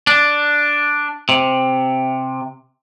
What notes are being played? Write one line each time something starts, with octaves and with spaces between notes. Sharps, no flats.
D4
C3